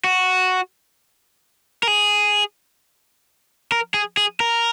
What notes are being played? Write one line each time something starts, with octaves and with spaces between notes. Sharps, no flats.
F#4
A#4
G#4
A#4
G#4
G#4
A#4